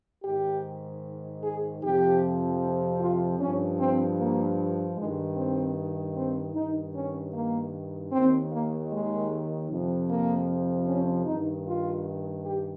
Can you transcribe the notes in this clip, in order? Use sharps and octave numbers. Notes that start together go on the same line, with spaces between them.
G#2 D#3 G4
G#4
F2 C3 F3 G4
F4
G2 F3 C#4
C4
A#3
G2 D#3 G#3
C4
C4
G2 D#3 D#4
C#4
A#3
D#2 D#3 C4
A#3
G#3
F2 C3 F3
A#3
C#4
G2 D#3 D#4
F4
G4